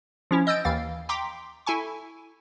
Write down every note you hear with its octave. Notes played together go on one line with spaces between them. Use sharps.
F3 C#4 E4
D#5 E6 G6 A6 D7
D#2 E3 F5 A6
G5 A#5 C6 D6 B6
E4 A4 G#5 C#6